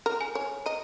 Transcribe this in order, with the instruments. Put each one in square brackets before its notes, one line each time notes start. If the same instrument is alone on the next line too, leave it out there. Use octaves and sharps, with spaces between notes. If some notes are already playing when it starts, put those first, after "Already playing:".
[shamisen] A#4
[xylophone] G#5
[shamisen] C#5
[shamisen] D#5 [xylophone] A#5